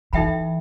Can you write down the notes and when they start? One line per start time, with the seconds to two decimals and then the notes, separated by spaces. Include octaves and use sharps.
0.13 E3 D#4 A4 E5 G5 B5